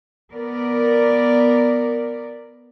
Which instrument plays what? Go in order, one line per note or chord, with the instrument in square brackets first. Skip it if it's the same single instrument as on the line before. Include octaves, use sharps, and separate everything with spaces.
[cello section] B3 A#4 D5